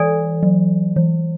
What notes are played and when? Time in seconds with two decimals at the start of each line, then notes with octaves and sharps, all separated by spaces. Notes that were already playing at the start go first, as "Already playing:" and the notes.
Already playing: E3 A4 D5 G#5
0.43 F#3
0.96 E3